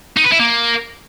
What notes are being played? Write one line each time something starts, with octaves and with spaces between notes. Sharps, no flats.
D#4
B4
E4
A#3